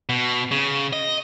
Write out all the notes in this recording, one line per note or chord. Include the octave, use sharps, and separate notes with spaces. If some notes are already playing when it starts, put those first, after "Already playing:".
B2
C#3
D#5